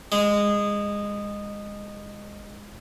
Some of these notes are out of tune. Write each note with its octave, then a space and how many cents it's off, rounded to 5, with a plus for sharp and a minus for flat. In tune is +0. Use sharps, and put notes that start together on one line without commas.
G#3 -20